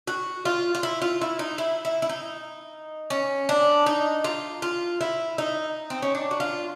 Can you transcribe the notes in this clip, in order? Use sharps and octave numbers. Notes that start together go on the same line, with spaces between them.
F#4
F4
F4
E4
F4
E4
D#4
E4
E4
E4
D#4
C#4
D4
D#4
F4
F4
E4
D#4
C4
C#4
D4
F#4
F4